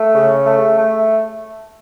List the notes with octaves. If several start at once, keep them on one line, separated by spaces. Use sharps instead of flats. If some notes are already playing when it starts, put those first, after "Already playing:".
Already playing: A3
C#3
A3
A3